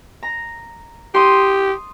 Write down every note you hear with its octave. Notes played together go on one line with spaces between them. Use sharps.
A#5
G4 C6 D#6